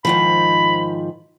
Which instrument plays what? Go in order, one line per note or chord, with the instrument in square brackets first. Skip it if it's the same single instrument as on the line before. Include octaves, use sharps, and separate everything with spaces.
[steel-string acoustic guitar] G#2 D#3 F3 [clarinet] B5